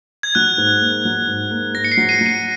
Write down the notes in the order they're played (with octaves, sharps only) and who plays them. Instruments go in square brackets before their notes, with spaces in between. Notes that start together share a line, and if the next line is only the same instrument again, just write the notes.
[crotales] G#6
[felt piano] F#3 [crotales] F#6
[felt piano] G#2
A#3
F#3
G#2
A#3
[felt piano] G#2 [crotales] A#6
[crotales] C#7
C7
[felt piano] F#3
[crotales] C7 D#7
[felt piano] F#3
[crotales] C7 D#7